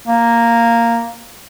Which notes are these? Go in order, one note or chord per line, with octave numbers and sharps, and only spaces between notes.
A#3